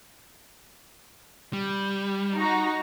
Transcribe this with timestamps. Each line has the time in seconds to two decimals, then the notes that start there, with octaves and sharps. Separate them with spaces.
1.53 G3
2.36 D#4 F#4 A#5